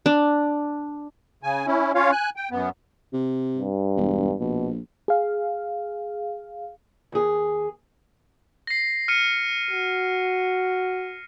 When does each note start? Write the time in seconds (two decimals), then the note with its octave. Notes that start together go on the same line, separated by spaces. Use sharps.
0.06 D4
1.43 C#3 G#5
1.67 C#4 E4
1.95 C#4 F4 C#5 F5
2.12 G#5 F#6
2.36 G5
2.51 F#2 B3
3.13 C3
3.56 G2
3.97 E1
4.40 A#1 B2
5.08 G#4 F5
7.12 D#2 G#4
8.67 A#6 C7
9.08 F6 C#7 D#7
9.71 F#4